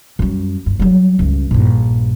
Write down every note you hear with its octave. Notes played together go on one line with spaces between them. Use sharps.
F#2 G3
G2
F#3 G3
C#2 G2
A#1 G2